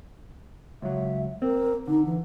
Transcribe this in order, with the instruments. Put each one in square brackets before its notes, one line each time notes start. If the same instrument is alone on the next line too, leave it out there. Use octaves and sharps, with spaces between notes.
[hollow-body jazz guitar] C#2 F#3 [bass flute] E5
[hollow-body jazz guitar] C4 [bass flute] A#4
[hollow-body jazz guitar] D3 [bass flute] D#4
[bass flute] E3